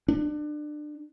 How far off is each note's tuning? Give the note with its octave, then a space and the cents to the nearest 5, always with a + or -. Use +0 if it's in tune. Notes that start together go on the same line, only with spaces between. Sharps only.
D4 +25